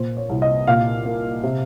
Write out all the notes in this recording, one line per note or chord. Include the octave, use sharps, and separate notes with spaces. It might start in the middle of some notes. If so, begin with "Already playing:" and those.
Already playing: A#2 C5
C#5
C2
D#5
A#2 F5
A#3
C3